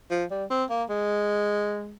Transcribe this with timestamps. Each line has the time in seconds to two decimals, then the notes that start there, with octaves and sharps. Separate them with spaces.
0.11 F3
0.31 G3
0.51 C4
0.70 A#3
0.90 G#3